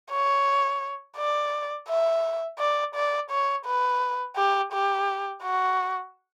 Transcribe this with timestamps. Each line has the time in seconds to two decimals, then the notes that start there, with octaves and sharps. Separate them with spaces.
0.11 C#5
1.17 D5
1.88 E5
2.59 D5
2.95 D5
3.31 C#5
3.66 B4
4.36 G4
4.73 G4
5.43 F#4